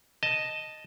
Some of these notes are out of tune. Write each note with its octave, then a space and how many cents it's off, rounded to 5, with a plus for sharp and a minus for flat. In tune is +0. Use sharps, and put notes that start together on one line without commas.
D#5 +0 A5 +0